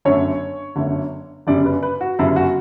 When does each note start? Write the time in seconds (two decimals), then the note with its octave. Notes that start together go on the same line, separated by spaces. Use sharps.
0.05 G1 F#2 D3 A3 C#5
0.76 G1 F#2 D3 A3
1.47 G1 F#2 C#3 G3 D5
1.66 B4
1.83 B4
2.01 F#4
2.19 G1 F#2 C#3 G3 E4
2.36 F#4